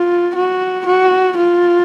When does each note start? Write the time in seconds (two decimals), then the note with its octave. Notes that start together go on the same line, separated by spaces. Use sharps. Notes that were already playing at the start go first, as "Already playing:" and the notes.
Already playing: F4
0.35 F#4
0.86 F#4
1.37 F4